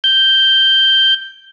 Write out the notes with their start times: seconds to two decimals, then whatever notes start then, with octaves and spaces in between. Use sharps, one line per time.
0.04 G6